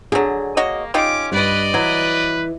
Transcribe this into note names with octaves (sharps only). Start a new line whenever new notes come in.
D3 F#3 G#4
A#3 F#4 C#5 D#5
C#4 D#4 F4 G4 D6
G2 B4 D5 D#5
E3 F#3 B4